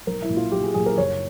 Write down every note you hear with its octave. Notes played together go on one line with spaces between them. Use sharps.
B1 A#4
E4
A#2 F#3
F4
B1 G4
G#4
A#2 F#3 G#4
A#4
F#1 C#5